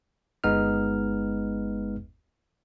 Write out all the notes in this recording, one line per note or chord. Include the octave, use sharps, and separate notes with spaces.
G1 G#3 B3 D#4 F6